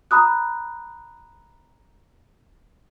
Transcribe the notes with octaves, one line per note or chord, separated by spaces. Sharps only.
A#5 B5 D#6 F#6